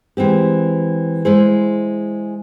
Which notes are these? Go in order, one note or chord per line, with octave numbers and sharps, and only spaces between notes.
E3 G#3 C4 G4
G#3 E4 G#4 C5